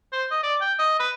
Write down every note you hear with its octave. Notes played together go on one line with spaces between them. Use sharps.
C5
D#5
D5
G5
D#5
B4